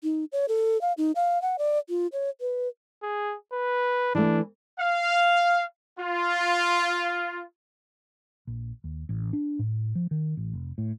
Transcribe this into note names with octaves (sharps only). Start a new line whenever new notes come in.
D#4
C#5
A4
F5
D#4
F5
F#5
D5
F4
C#5
B4
G#4
B4
E3 A3 D4
F5
F4
A#1
D#2
A1
D4
A2
F3
D#3
A1
F1
A2